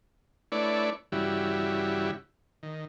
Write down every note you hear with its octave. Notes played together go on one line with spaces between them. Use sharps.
A3 D4 E4 B4 C#5 D5
G2 C#3 E3 G3 E4 F#4
D#3